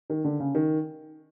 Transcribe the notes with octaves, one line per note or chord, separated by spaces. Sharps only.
D#3
D3
C#3
D#3